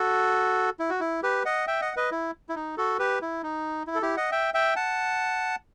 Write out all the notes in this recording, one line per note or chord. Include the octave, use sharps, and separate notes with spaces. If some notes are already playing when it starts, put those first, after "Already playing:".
Already playing: F#4 A4
E4
F#4
E4
G4 B4
D#5 F#5
E5 G5
D#5 F#5
B4 D#5
E4
E4
D#4
F#4 A4
G4 B4
E4
D#4
E4
A4
E4 G4
D#5 F#5
E5 G5
E5 G5
F#5 A5